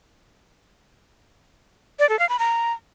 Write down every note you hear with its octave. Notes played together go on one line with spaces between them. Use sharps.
D5
A4
F5
B5
A#5